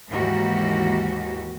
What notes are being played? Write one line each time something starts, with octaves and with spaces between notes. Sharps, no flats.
D#2 G#2 E3 A#3 F#4 G4